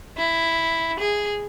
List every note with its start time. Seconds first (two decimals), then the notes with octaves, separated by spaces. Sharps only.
0.17 E4
0.99 G#4